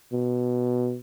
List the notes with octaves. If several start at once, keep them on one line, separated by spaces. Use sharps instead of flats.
B2